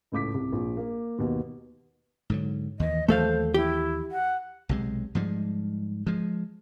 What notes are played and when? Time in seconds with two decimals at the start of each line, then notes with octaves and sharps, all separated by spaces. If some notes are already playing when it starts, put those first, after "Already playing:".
0.12 C#2 A2 D6 B6
0.34 C2
0.52 A#1
0.77 A#3
1.19 D#2 B2
2.30 G#2 D3 F#3
2.80 D#2 E3 D#5
3.08 D#2 E3 F#3 A3 A4 C5 F5
3.54 E4 G4
4.12 F#5
4.69 B1 C3 G#3
5.15 G#2 F3 G3 G#3
6.07 F3 G#3